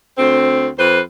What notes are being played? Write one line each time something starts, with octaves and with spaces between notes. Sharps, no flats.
D2 C4
F2 B4 C5